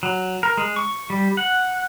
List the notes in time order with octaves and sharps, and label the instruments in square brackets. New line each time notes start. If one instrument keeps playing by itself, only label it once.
[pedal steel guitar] F#3
A#4
G#3
C#6
G3
F#5